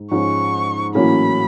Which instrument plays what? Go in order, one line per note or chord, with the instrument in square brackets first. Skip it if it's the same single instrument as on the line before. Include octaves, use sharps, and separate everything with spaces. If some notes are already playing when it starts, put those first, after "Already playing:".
Already playing: [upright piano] G#2 G#3
[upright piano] G#2 F3 G#3 C#4 [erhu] C#6
[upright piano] A1 A2 F#3 A#3 C#4 [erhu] B5